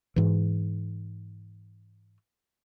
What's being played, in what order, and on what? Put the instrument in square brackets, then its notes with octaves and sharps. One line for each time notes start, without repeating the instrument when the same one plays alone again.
[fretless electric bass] G#2 E3